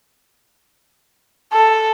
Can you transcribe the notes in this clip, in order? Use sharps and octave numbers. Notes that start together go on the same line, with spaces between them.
A4